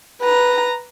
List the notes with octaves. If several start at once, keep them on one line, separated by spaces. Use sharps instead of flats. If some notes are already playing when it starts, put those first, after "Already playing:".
B4 A#5